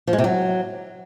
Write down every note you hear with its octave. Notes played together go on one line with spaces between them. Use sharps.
F3
G#3
C3
F#3